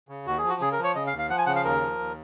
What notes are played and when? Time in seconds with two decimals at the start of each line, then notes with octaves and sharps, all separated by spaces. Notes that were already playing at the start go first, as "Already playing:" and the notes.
0.09 C#3
0.26 D#2 F#4
0.38 G#4
0.44 F3 F#4
0.61 C#3 G#4
0.72 A#4
0.78 F3
0.84 C#5
0.95 C#3 D#5
1.07 F5
1.13 D#2
1.19 F5
1.29 F3 F#5
1.38 G#5
1.46 C#3 F#5
1.56 F5
1.64 D#2 A#4
1.81 F3
1.99 D#2